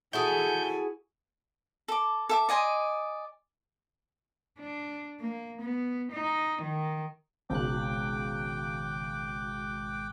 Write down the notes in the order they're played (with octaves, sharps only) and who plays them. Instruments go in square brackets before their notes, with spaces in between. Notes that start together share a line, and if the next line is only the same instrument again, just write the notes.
[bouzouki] E4 F#4 G#4 [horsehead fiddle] A4 G#5 [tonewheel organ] G6
[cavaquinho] A4 D6
A4 E5 D6
D5 D#5 G#5 C6
[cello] D4
A#3
B3
D#4
D#3
[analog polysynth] G#1 F#6 [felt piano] C#2 G#2 B2 [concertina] G5 D6